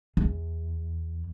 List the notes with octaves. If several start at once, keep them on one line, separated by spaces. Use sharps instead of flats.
E2